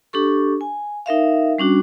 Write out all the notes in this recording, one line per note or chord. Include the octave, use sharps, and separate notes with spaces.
D4 G4 A4 C#6
G#5
D#4 A#4 E5 F5
G3 C#4 D4 F#4